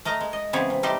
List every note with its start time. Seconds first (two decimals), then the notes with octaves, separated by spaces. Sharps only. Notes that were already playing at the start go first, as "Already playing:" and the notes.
0.05 A3 A#4 D#5 A#5
0.21 G#3
0.33 D#5
0.53 C#3 E3 B3 C4 G#4 C#5
0.70 C3
0.83 G3 A3 D#4 G4 C5